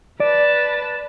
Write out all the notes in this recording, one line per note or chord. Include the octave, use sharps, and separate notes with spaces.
B4 D5 A5